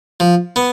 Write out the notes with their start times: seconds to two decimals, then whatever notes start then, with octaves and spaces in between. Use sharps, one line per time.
0.20 F3
0.56 B3